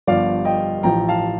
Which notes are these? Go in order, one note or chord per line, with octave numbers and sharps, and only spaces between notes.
G1 G2 F3 D5 F5
D#5 G5
A1 A2 F3 G5 A#5
F5 A5